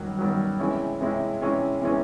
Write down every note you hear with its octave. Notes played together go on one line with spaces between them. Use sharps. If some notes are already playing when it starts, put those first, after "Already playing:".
Already playing: G2 D#3 F#3
G2 D#3 F#3
C3 E3 G#3 C#4 E4
C3 E3 G#3 C#4 E4
C3 E3 G#3 C#4 E4
C3 E3 G#3 C#4 E4